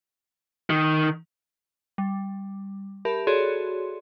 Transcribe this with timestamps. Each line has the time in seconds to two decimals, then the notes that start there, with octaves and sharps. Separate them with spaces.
0.70 D#3
1.98 G3
3.05 G4 A#4 E5 A5 B5
3.27 F#4 G#4 A4 C#5 D5 C6